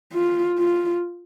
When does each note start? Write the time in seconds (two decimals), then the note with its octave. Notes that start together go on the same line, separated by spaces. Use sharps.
0.13 F4
0.59 F4